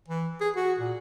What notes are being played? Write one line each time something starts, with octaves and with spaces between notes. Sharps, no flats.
E3
G#4
F#4
A#2